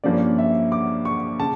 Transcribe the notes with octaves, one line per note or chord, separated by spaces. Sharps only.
G2 F3 A#3 C#4 D5
E5
D6
C#6
C#3 A5